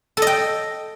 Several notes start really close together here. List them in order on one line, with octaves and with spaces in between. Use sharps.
A4 D#5 G5